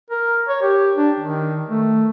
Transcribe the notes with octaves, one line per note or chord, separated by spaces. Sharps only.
A#4
C#5
G4
D4
D#3
A3